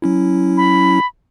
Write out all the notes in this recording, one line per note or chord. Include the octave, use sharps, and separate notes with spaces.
F#3 C#4 E4
B5